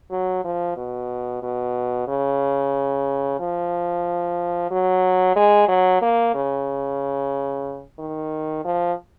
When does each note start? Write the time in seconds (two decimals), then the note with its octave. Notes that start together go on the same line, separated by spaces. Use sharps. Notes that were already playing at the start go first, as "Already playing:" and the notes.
0.11 F#3
0.45 F3
0.77 B2
1.43 B2
2.08 C#3
3.40 F3
4.71 F#3
5.36 G#3
5.69 F#3
6.02 A#3
6.35 C#3
7.99 D#3
8.65 F3